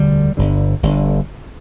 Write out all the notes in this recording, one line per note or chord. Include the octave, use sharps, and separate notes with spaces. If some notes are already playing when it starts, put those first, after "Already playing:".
Already playing: E1 D2 D3 G3
G1 G2 D3
G1 G2 D3